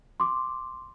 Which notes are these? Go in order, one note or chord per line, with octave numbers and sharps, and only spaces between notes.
C6 D6